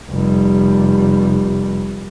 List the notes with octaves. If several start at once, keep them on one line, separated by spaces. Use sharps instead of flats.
F1 G3